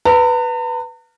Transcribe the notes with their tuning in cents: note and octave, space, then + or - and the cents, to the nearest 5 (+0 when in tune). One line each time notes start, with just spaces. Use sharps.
B4 +0 A#5 -45